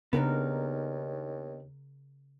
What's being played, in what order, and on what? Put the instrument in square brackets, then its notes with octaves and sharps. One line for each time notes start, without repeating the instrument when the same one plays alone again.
[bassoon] D#2 [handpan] C#3 A#4 [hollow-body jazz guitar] B3 D4 D#4